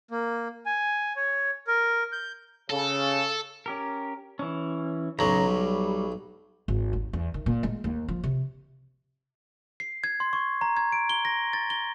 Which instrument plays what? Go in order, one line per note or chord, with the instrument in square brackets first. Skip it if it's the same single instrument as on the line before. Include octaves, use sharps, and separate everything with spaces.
[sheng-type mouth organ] A#3
G#5
C#5
A#4
G6
[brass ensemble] C#3 [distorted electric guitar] A4
[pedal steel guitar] C#4 G4 A#4
E3 C#4
[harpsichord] B1 F#3 [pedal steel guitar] C#3 C#5 A#5
[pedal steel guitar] G3
[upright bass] G#1
D#2
E2
D#3
A#2
G#3
D#2
F3
C3
[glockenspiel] C7
G#6
C6
C#6
A#5
G#6
D7
G7
A#6
A6
G7